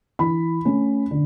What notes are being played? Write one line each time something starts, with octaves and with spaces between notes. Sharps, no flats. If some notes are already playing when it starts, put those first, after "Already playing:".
E3 B5
A3 C#4
D3